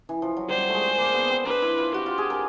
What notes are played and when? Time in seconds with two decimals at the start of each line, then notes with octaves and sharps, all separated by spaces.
0.09 E3
0.22 F3
0.37 F#3
0.49 G3 C5
0.69 A3
0.74 G#3
0.98 A#3
1.14 B3
1.30 C4
1.46 D4 B4
1.62 E4
1.78 F4
1.94 F#4 G4
2.06 F4
2.18 G#4
2.30 A#4